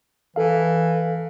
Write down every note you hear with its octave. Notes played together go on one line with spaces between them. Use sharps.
E3 A4 F5